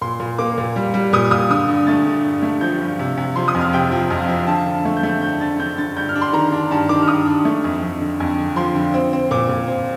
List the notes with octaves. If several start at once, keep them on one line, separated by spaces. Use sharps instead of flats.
A#2 C6
A#2
A#3 D6
A#2
G3
G3
A#2 D#6
A#2 D#6
D3 D#6
G2
A3 A6
D3
G2
A3
F3 G6
G2
C3
C3
F3 C6
D#6
F2
F6
C3 G5
F3
F2
F3
D3 A5
D3
A3
G6
A3
G6
D3 G6
D3 A6
D3 G6
D3 A6
G2 G6
F6
D4
C6
D#3 A#5
D4
G2 A5
D#3 D6
F6
G2 D#6
D4
A3
F2
F2
D3
F2
D3
F3 C6
D3
C4
C4
A#2 D6
A#2
C4